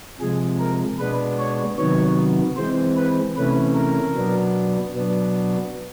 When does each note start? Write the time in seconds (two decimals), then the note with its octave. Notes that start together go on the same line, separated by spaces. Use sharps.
0.20 C3 F3 G#3 G#4
0.59 A#4
0.99 B2 G#3 B3 D4 B4
1.39 C#5
1.78 C3 D#3 F#3 B3 C#5
2.57 E3 G#3 C4 C5
2.96 B4
3.36 C3 E3 A3 C#4 B4
3.75 A#4
4.15 B2 F#3 B3 D4
4.94 B2 F#3 B3 D4